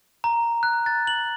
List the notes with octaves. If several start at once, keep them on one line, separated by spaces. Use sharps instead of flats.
A#5
F#6
A6
F#7